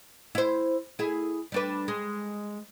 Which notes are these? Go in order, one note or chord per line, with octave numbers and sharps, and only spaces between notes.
E4 C5
E4 G#4
G3 D4 B4
G#3